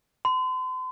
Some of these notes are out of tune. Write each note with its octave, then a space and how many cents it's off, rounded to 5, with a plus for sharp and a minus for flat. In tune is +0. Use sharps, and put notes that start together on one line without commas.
C6 -40